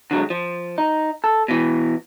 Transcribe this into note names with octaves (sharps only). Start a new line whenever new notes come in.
D3 F#3 G#3
F3
D#4
A4
B2 E3